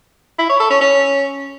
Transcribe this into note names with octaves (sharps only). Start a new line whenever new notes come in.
E4
C#5
A4
C#4
C#4